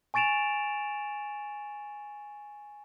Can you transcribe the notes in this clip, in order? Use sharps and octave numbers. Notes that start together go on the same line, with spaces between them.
G#5 C#6 A6 D7 E7 F7